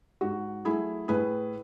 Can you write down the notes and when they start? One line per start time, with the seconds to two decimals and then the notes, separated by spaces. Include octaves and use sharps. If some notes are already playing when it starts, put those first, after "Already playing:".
0.21 G#2 F#4
0.65 F#3 A3 E4 G#4
1.08 A2 G#4 B4